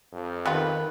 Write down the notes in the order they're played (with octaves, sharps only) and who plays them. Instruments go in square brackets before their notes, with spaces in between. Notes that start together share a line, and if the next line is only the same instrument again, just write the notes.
[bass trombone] F2
[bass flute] D#3 [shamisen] G3 B3 F4 [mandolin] B4